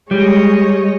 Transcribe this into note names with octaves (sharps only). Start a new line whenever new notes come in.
G3 G#3 C#5 D#5